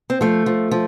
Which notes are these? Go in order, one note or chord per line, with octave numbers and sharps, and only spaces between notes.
C4
F3 A3
F3
F3